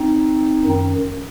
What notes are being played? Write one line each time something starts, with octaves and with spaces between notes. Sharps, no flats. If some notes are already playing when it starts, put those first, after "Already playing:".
Already playing: C4 D#4
F#2 D#3